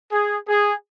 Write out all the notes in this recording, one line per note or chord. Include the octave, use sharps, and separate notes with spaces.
G#4
G#4